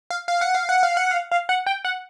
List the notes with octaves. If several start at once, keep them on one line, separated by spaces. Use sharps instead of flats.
F5
F5
F#5
F5
F#5
F5
F#5
F5
F5
F#5
G5
F#5